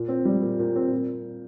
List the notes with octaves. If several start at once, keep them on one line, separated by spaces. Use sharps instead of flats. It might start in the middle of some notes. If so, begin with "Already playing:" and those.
Already playing: A#2
C4
G3
A#2
A#2
C4
A#2